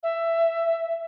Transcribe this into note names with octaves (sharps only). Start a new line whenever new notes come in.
E5